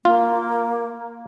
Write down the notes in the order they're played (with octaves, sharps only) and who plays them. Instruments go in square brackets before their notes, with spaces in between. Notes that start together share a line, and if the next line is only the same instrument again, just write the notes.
[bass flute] A#3 [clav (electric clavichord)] F4